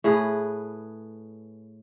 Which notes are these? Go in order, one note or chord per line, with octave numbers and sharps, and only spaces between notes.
A2 G#4 B4